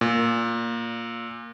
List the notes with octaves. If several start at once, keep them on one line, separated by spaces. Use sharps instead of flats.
A#2